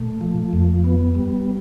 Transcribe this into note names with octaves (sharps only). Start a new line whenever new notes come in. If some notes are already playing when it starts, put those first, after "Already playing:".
Already playing: A#2 A3
F3
F2
B3
G3